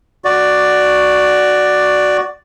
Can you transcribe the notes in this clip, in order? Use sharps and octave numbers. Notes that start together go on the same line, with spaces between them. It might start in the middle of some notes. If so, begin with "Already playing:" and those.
F#4 D5